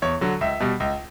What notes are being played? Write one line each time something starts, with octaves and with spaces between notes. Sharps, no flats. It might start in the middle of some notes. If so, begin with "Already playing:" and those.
E2 C#5
D3 F#3
C#2 E5
B2 G3
C#2